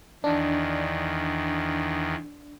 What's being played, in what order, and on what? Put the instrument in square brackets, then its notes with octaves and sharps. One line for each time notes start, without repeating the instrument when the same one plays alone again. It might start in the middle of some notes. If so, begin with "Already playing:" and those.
[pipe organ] E2 D#3 [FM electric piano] D4